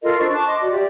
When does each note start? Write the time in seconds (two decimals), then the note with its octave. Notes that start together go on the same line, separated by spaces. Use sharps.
0.02 F4 A4 A#4 D#5
0.19 D4 C5 C#6
0.33 A5 C#6 D6 F#6
0.47 D#5 C6 D6
0.60 F#4 D5
0.72 G4 D5 E5